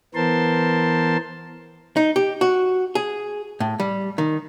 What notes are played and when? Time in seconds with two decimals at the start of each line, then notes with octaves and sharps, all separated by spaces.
0.15 E3 B3 A#4 C5 A5 C6
1.97 D#4
2.16 G4
2.41 F#4
2.95 G#4
3.60 A2
3.80 G3
4.18 D#3